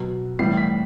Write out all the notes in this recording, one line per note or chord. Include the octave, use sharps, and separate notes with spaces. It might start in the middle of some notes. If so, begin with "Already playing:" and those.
Already playing: B2 F#3
A2 E3 G3 C7
B6